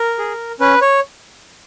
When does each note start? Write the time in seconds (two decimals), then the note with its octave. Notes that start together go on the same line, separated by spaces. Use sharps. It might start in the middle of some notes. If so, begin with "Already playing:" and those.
Already playing: A#4
0.18 G#4
0.60 C#4 B4
0.82 C#5